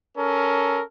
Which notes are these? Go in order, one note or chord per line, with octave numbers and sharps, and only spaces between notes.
C#4 A4 A#4